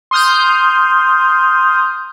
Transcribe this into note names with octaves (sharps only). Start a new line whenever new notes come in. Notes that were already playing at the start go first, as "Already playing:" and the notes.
C6 D#6 F6 G6